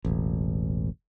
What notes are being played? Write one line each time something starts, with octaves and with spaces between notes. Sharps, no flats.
E1 A1